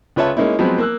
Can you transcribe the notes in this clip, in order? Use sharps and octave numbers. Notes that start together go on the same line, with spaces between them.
C#2 F4 B4 C#5 E5 A5
G#3 A#3 C#4 D#4 E4
F3 F#3 G#3 B3 C4
A#3 E6 F#6